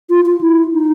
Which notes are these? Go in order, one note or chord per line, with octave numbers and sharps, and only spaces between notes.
F4
F4
E4
D#4